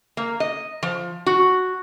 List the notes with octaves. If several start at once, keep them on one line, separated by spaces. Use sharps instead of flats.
A#3
D#5
F3
F#4